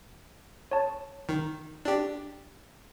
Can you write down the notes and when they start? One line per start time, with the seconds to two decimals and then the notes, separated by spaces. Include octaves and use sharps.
0.71 C#5 A5
1.29 D#3
1.85 D4 G4